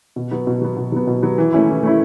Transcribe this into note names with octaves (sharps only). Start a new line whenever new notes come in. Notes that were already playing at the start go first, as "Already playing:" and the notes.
B2
F#3 B3
B2
F#3 B3
B2
F#3 B3
B2
F#3 B3
E3
A3 C#4 E4
E3
A3 C#4 E4